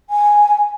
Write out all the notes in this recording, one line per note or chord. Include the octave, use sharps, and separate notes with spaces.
G#5